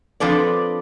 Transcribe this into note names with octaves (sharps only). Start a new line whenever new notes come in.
F3 C4 D4 A4 B4 D5